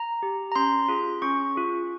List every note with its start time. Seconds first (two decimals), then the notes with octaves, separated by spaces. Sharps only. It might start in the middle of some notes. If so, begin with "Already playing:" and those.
Already playing: A#5
0.23 G4
0.52 A#5
0.56 C#4 C6
0.88 F4 G#4
1.22 C#4 C#6
1.55 F4 G#4